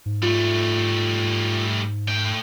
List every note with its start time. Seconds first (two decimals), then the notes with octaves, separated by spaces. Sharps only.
0.06 G#2
0.23 G3 A3 F4
2.08 A2 G5